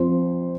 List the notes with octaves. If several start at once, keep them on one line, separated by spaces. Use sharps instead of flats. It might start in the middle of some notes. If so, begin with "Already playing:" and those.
Already playing: F2 F3 C5